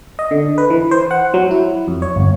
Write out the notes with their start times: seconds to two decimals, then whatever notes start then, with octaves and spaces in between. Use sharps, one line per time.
0.19 D#5
0.31 D3
0.58 B4
0.70 E3
0.91 C5
1.11 F#5
1.34 F#3
1.51 E4
1.88 F2
2.02 C#5
2.16 G1